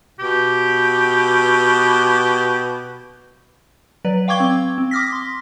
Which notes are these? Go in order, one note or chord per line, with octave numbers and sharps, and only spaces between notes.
B2 G4
F#3 B4 D5
F5 G5 C#6 D6 G#6 G7
C4
C4
D6 D#6 F6 A#6 B6
C6